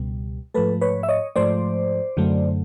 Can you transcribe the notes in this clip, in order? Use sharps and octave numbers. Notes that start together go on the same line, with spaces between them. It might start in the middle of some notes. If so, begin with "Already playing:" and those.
Already playing: C#2 B2 G3
G#2 F3 A3 A4 B4
B4 C#5
E5
C#5 D#5
G#2 F3 A3 C5 D5
F#2 D3 F#3 A3